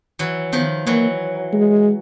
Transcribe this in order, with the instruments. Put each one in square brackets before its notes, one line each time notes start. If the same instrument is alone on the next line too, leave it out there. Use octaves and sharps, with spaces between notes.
[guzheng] E3 F#3
[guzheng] D#3 F3 [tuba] B3
[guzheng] E3 F#3 [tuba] A#3
[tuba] G#3